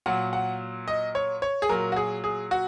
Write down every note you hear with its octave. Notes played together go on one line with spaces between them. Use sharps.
A#2 F#3 F#5
F#5
D#5
C#5
C#5
G#4
A#2 F#3 A#4
F#4
G#4
G#4
F#4